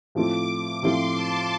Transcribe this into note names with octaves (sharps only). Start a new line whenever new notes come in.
A2 F3 A3 C4 F4 D6
A2 F3 A3 C4 F4 C6
A5